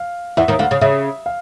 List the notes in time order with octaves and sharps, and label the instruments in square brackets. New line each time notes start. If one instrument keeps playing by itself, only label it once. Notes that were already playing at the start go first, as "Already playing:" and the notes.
Already playing: [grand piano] F5
[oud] E2 E3 [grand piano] E5
[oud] D#2 D#3
[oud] D2 D3 [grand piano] F5
[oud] C#3
[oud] C#3 [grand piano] E5
[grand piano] F5